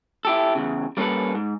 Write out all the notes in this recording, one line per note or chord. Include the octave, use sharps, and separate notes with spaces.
E4 G4 A4
E2 C#3
G3 A#3 C#4 G#4 A4 B4
G#2